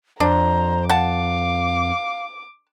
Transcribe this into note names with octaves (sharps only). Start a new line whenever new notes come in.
F2 D4 C5 A#5
F5 F#5 A5 D6